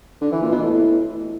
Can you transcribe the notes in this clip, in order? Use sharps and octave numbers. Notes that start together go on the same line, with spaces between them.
D3
E3
A#2
B2
A2